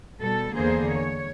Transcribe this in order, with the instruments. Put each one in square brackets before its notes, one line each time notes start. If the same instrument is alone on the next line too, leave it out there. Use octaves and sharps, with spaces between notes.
[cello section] B2 G3 A4
E2 D3 A#3 G#4 C5
C#5